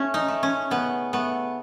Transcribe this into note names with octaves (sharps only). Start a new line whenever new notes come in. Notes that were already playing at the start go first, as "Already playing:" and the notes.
Already playing: A3 C#4
D#4
A3
C#4
C#3 B3
A3 B3